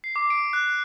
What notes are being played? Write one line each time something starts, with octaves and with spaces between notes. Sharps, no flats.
C7
D6
D7
F#6